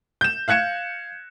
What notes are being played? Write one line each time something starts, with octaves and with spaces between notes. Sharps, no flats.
G6 E7
F5 F#6 G#6 C#7 E7